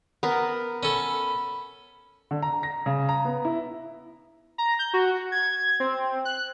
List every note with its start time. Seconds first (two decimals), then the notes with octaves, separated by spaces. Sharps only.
0.23 B3 A#4
0.83 C#4 A4 B5
2.31 D3
2.43 A#5
2.63 A#6
2.86 C#3
3.09 A#5
3.25 B3
3.45 E4
4.58 A#5
4.79 G6
4.94 F#4
5.32 G#6
5.80 C4
6.25 F#6